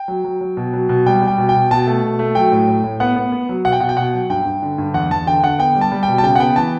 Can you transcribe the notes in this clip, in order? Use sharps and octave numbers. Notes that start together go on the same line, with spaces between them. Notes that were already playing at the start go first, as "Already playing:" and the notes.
Already playing: G5
F#3
F#3
F#3
B2
F#3
B2
G3 G5
G3
G5
B2
G5
B2
B2 A5
A3
B2
A3
F#3 G5
A2
A2
A2
B3 F#5
B3
B3
F#3
B2 F#5
G5
B2 F#5
G5
B2 F#5
F#3
G2 G5
G2
D3
G2
E2 F#5
E2 A5
D3 G5
D3 F#5
B3 G5
G3
A5
G3
G5
B2
A5
C#3 G5
F#5
B3 G5
E3 A5